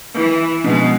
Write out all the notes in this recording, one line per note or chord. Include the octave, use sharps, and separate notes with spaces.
E3
B2 F3 G#3 C#4 D4